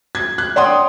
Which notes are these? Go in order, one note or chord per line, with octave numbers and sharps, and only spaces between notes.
G#6
F#6
C#5 D5 F#5 G5 C6 D#6